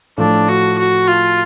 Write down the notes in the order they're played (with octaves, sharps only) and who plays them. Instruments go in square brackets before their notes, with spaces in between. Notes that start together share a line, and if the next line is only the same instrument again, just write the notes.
[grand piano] A2 F3 A3 [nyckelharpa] D4
[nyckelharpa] F#4
F#4
F4